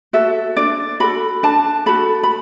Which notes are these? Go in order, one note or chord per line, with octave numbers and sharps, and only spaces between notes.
F#4 A4 E5
D4 D5
F#4 A4 B5
D4 A5
F#4 A4 B5
B5